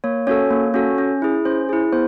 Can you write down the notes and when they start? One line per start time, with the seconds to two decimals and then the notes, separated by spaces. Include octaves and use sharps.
0.04 A#3 C#5
0.27 C#4 F#4 A4 C#5
0.50 A#3
0.74 C#4 F#4 A4
0.98 C#4
1.22 E4 G#4
1.45 C#4 C5
1.69 E4 G#4
1.93 B3 C5